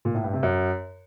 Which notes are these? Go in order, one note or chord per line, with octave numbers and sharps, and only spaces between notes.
A#2
A2
G2
C3
F#2